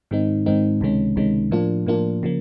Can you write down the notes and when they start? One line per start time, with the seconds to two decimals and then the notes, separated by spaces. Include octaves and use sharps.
0.11 G#2 D#3 G#3 C4 D#4
0.46 G#2 D#3 G#3 C4 D#4
0.81 C#2 C3 D#3 G#3 C#4
1.16 C#2 C3 D#3 G#3 C#4
1.51 A2 F3 A#3 D4 F4
1.87 A2 F3 A#3 D4 F4
2.23 C#3 F3 A#3